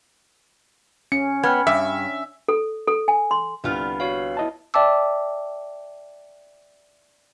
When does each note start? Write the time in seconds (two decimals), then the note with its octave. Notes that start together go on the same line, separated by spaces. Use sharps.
1.12 C#4 C#7
1.43 B3 G5 F6 G#6
1.67 G2 E5
2.48 A4
2.88 A4
3.08 G#5
3.31 C6
3.64 C2 D3 B3 F4 B4 F6
4.00 F#4 C#5 F5
4.37 E4 D#5 A5
4.74 D5 E5 G5 A5 D6 E6